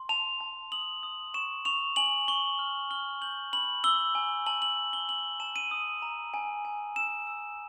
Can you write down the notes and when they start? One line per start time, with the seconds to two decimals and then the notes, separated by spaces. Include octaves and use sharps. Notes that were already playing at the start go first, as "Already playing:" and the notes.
Already playing: C6
0.09 A5 F7
0.40 A5
0.72 D#6 F#7
1.03 D#6
1.34 C#6 E7
1.65 C#6 F7
1.96 G#5 F#7
2.28 C#6 G7
2.59 F6
2.90 F6 G7
3.22 G6 F#7
3.53 B5 F#7
3.84 E6 G7
4.15 G#5
4.46 A5 F#7
4.62 F#7
4.78 A5
4.93 G7
5.09 A5 F#7
5.40 A5 E7
5.56 D#7
5.71 D#6
6.02 A#5
6.34 G#5
6.65 G#5
6.96 E6 E7
7.27 E6